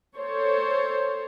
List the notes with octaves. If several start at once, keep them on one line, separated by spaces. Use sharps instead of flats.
A4 C5 C#5